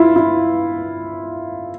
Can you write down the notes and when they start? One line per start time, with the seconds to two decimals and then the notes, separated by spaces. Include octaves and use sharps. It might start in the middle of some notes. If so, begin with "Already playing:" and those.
Already playing: E4 F4
0.16 E4